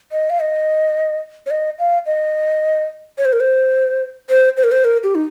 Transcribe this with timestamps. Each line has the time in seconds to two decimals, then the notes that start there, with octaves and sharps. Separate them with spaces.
0.12 D#5
0.30 F5
0.40 D#5
1.46 C#5
1.51 D#5
1.79 F5
2.06 D#5
3.18 C#5
3.25 C5
3.33 A#4
3.40 C5
4.30 C5
4.57 C5
4.64 A#4
4.72 C5
4.84 A#4
5.03 G4
5.15 D#4